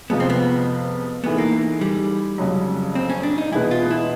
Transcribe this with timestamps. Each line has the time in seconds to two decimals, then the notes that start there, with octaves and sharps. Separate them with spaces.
0.10 F2 C3 F3 G#3 B3
0.20 C4
0.30 B3
1.24 G#2 E3 A3 B3
1.38 A#3
1.81 G3
2.38 F2 C#3 F#3
2.95 C4
3.10 C#4
3.23 D4
3.38 D#4
3.52 E2 B2 G#3 B3 E4
3.71 F4
3.90 E4